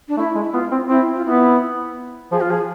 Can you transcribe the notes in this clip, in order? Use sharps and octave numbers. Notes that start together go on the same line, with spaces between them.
D4
A3 E4
G#3
E4
B3 F4
C4
C4 E4
F4
B3 E4
F3 G#4
F4
F3 G#4